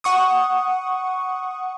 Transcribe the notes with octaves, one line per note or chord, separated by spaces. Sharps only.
F#5 C#6 D#6